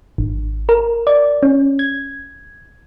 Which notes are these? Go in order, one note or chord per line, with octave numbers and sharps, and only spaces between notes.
G#1
A#4
D5
C#4
G#6